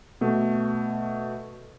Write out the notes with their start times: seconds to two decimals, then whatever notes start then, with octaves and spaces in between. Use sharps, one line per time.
0.21 B2 A3